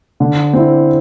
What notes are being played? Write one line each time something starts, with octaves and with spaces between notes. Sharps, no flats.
D3
C4 E4